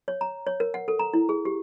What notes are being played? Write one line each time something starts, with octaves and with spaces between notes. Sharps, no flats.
C#5
A#5
C#5
A#4
F#5
A4
A#5
E4
G#4
G4